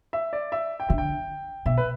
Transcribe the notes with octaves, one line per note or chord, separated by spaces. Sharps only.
E5
D5
E5
G5
D3 E5
G5
B2 E5
B4